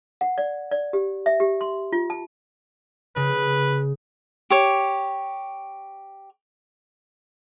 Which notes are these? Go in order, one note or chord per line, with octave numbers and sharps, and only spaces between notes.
F#5
D5
D5
G4
E5
G4
C6
F4
A5
C#3 B4
G4 C#5